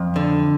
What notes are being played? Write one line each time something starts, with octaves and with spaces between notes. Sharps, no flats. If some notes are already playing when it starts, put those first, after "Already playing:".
Already playing: F2
D3